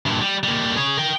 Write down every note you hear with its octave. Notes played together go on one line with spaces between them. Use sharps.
G2 A#2
G3
G3 A#3
G#4 C#5
A#4 G5